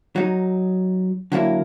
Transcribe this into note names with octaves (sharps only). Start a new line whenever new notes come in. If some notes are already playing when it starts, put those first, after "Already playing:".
F#3 D#4
D3 F#3 A#3 E4